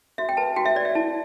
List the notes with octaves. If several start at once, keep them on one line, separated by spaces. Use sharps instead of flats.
F#4 E5
G5
B4 A5
F#4 G5
E5
B4 D5
E5
E4 A5